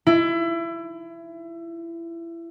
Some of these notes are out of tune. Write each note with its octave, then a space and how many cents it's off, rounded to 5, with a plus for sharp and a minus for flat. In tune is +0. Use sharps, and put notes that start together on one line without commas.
E4 +25